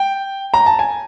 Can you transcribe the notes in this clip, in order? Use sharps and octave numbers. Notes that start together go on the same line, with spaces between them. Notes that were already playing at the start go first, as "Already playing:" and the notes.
Already playing: G5
A#5
A5
G#5